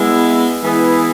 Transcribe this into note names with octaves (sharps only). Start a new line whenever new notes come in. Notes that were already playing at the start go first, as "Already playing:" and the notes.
Already playing: G#3 B3 E4
E3 G#3 B3 E4 G#4